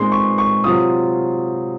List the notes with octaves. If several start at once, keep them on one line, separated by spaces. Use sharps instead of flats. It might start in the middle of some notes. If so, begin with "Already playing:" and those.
Already playing: A#2 G#3 C4 D#4 C6
C#6
C#6
C3 F#3 C4 F4 D#6